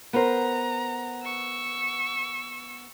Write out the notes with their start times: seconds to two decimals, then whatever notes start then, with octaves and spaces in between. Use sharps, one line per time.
0.13 B3 A#4 C5 A#5
1.23 C#6 E6